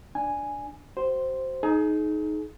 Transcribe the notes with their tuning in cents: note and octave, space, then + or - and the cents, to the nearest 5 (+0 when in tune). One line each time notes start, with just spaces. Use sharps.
D4 +0 G#5 +0
F#4 +40 C5 +0
D#4 +0 G#4 +35